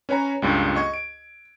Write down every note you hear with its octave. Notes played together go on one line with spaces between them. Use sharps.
C#4 B4 C#5 G#5 A#5
C#2 G2 A#2
D#5 C#6 G#6
D7